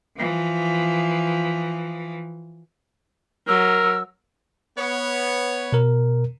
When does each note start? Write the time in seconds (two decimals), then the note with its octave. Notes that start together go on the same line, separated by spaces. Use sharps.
0.17 E3 F3
3.48 F#3 A#4 E6
4.78 B3 C#5
5.73 B2 A#4